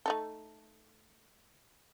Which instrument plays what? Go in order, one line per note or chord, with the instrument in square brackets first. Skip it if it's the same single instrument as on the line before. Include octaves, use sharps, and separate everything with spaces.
[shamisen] A3 D#4 A4